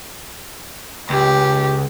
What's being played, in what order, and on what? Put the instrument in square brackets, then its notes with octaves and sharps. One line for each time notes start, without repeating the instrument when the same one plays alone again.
[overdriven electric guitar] C#2 [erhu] G4